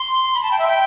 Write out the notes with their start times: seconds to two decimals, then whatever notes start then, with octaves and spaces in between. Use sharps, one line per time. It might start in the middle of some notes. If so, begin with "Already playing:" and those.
Already playing: C6
0.35 B5
0.43 A5
0.51 G5
0.59 E5
0.68 G5